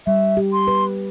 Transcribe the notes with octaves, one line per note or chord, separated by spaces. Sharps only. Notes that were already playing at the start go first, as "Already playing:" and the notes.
G3 E5
G4
C6
B4